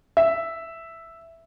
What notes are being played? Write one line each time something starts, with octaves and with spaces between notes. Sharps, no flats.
E5